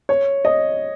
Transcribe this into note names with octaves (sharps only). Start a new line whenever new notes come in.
C#5
D#5